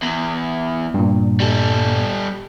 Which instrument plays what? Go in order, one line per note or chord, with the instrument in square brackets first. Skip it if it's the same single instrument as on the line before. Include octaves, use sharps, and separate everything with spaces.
[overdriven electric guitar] E2
[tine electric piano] G2 A#2
[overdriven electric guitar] G3 A4